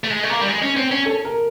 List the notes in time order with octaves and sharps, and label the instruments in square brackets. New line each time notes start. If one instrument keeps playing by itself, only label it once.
[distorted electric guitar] A3
G#3
A3
A#3
G3
G#3
C#4
C4
C#4
[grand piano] A4
A#4